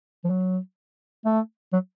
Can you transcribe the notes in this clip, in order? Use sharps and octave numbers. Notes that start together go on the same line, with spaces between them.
F3
F#3
A3
F#3